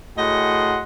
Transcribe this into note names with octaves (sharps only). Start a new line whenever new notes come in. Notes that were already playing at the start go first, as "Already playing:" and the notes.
A2 F#4 G#4 D#5 F#5 C6